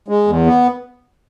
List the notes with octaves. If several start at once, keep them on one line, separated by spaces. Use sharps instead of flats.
G#3
E2
B3